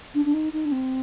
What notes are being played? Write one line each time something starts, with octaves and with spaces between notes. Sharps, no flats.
D4
D4
D#4
D#4
D4
C4